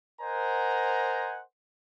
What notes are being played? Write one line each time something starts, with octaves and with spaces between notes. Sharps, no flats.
A#4 C5 D#5 F#5 G#5 A#5